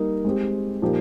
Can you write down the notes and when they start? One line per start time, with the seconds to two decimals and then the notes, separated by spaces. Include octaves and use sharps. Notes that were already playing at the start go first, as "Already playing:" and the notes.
Already playing: G3 A#3 D#4 A#4
0.25 G#3 C4 G4
0.82 A#2 F3 A#3 D#4 G4